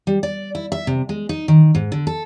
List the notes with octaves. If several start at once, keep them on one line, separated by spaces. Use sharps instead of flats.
G3
D5
E4
E5
C3
G#3
D#4
D#3
G#2
D3
A4